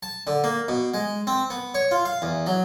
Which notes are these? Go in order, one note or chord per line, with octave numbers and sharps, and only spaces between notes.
A5
D3
A#3
B2
G#3
C4
B3
C#5
F4
F5
E2
F#3